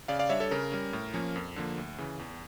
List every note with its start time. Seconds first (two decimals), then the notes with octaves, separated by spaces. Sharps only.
0.08 C#3 D5 F5
0.19 D5 F5
0.29 G3 D4 C#5 E5
0.40 A4 C#5
0.51 C#3 A#4
0.72 G3 C#4
0.93 A2
1.14 F3 A#3 C#4
1.36 F2
1.56 D3 F3 A#3
1.78 D2
1.98 C#3 E3
2.19 E2